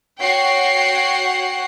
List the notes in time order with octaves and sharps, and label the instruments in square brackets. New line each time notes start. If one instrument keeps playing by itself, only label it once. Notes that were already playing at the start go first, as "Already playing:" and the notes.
[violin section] F#4 C#5 F#5 G5 C7